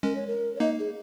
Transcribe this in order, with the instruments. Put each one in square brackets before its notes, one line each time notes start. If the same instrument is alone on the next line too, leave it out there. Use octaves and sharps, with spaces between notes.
[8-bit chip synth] G#3 C#4 [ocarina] A#4
[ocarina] C#5
A#4
C#5
[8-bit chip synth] A#3 D#4 [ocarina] D#5
[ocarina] G#4